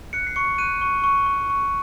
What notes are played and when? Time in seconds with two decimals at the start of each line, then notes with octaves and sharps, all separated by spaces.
0.13 F#6 C#7
0.27 C7
0.36 C#6 C#7
0.58 F#6 D#7
0.81 C#6
1.04 C#6
1.26 C#6
1.50 C#6